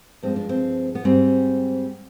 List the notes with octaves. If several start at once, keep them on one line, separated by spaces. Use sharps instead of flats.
G2 F3 G#3 C4
D4
C4
B3
G#2 G3 C4